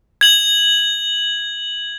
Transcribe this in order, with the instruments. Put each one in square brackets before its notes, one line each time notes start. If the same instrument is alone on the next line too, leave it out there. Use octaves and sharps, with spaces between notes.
[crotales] G#6 F#7